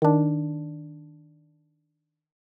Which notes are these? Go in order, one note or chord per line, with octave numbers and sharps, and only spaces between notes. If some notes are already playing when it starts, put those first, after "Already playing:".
D#3 D4